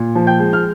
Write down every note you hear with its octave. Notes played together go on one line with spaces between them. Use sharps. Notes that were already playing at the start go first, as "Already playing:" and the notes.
Already playing: A#2
F3
G5 G6
G#3
F6